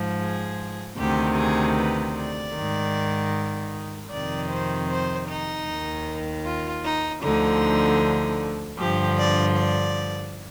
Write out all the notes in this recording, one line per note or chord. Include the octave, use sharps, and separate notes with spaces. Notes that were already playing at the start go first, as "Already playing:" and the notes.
Already playing: G#2 F3
G#4
D2 C3 D#3 G4
G#4
B4
D5
G#2 D#3
F2 C3 D#3 D5
C5
C5
D#4
D#2 D#3
F4
D#4
D2 D3 F3 D#4
G2 D3 F3 G4
D5
D5